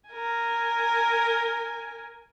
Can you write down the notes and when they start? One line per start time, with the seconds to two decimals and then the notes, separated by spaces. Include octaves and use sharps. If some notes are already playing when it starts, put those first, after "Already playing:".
0.10 A#4 G#5